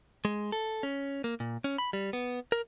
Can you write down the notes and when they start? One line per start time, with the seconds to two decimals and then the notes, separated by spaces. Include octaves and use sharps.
0.25 G#3
0.52 A4
0.83 C#4
1.24 A#3
1.40 A#2
1.64 C#4
1.78 B5
1.93 G3
2.13 B3
2.52 A#4